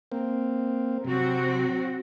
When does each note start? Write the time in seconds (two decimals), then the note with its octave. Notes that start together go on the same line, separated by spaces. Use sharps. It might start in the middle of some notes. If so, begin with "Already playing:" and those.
0.12 A#3 C4
1.05 C3 F#3 C4 F#4